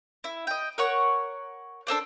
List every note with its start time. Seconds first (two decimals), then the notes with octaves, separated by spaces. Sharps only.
0.24 E4
0.47 D#5 G5
0.78 A#4 C#5 F#5 C#6
1.87 D4 A4 C5 D5